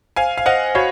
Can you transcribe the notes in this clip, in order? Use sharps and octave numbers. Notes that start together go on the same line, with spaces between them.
C5 F5 G#5
F5
C5 D#5 F#5
F#4 C#5 F5